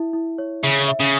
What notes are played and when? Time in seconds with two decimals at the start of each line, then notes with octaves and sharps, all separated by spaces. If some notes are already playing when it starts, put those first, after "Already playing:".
Already playing: E4 E5
0.13 E4
0.38 C#5
0.63 C#3 E5
0.88 E5
1.00 C#3